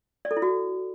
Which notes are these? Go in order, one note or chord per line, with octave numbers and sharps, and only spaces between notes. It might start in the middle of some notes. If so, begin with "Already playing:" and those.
D5
A4
E4
F#4